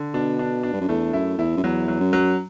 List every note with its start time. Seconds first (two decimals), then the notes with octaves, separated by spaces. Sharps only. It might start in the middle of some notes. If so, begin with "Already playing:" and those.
Already playing: D3
0.14 B2 D4
0.39 D4
0.63 D4
0.73 G2
0.81 F#2
0.89 E2 A3
1.13 F#2 E4
1.38 E2 E4
1.57 F#2
1.63 E2 F#3
1.88 F#3
2.00 F#2
2.13 F#3